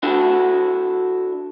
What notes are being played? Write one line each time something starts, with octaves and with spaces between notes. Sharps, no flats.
D4 E4 F#4 A4